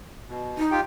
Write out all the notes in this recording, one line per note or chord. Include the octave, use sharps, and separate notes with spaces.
B2
D#4
F4 G4 G5